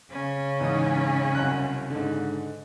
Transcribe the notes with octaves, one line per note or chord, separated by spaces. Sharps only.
C#3 C#4
E2 G#2 D#6
C2 F#2 F#6
G#2 D3